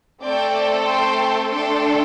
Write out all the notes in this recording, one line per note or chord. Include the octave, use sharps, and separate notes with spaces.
A3 C4 A4 D5 G5
G5 C6
A3 D4 A4 G5 C6